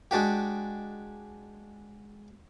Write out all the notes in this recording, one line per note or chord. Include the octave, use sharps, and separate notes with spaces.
G#3 D4 F#4 G4